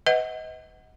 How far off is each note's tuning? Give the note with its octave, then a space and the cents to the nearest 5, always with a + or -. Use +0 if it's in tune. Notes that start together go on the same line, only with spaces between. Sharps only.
B4 +30 D#5 +30 F#5 +0